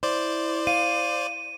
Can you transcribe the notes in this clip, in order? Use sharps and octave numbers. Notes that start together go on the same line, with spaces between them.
E4 C5 D5
F5 D#7